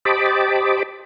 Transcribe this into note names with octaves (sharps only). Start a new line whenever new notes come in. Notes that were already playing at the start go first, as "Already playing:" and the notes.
G4 C5 D#5 A5 B5 D6